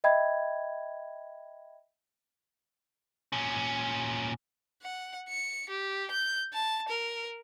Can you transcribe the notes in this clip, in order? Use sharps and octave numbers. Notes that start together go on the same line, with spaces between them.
D#5 E5 G5 B5 G#6
A#2 C#4
F#5
C#7
G4
G6
A5
A#4